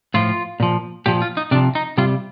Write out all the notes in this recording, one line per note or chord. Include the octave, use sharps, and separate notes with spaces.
A2 F3 F4
A#2 F3
A#2 F3 G4
F4
D#4
C3 F3 D4
D#4
C3 G3 F4